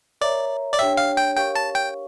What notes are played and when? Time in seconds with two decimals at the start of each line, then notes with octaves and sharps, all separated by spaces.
0.21 A#4 C#5 D5 E5 A#5
0.74 D5
0.79 D4 G4 C#5 E5 G5
0.97 F5
1.17 G5
1.36 G4 A#4 C#5 F5 G5 C#6
1.56 A5
1.75 G5